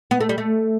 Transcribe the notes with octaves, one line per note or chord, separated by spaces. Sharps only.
B3
A3
G3
A3